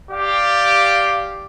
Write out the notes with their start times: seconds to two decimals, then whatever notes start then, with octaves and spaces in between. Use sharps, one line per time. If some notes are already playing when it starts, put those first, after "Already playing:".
0.11 G4 D5 F5